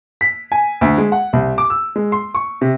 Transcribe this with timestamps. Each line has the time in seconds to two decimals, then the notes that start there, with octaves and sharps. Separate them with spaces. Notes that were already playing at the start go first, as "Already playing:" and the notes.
0.21 B6
0.52 G#5
0.81 D2
0.98 G#3
1.12 F#5
1.33 C2
1.58 D6
1.70 E6
1.96 G#3
2.12 C6
2.35 C#6
2.61 C3